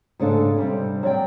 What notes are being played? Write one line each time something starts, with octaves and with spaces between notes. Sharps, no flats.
G#2 C#3 D4 A4
C3 G3
F#3 D5 G5